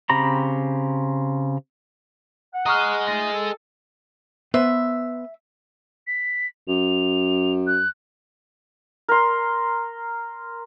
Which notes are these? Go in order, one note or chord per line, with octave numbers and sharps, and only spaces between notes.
C#3 C4 G4 A#5 B5
F#5
G#4 D#5 A#5 C#6 F6
A3 D#4 F4 A#6
A4
B3 B4 C5 E5
B6
F#2 F7
F#6
A#4 C6